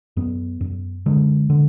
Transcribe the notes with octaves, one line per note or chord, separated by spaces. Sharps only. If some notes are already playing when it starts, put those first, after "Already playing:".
F#2 B3
F#2
D3 G#3
D3